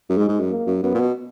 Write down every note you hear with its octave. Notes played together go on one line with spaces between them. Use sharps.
F#2
G#2 G#3
G#2
F#2
A#3
F#2
F#2 B3
A#2
B2